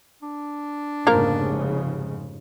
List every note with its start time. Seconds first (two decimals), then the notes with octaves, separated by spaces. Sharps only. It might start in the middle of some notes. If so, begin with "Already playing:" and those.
0.23 D4
1.07 F1 G#2 C#3 F3 A#3 A#4